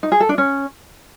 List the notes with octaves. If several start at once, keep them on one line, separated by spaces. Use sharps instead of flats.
D#4
G#4
A4
D4
C#4